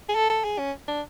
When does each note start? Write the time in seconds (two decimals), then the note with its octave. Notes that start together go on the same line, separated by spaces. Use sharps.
0.09 G#4
0.15 A4
0.30 A4
0.45 G#4
0.59 C#4
0.88 D4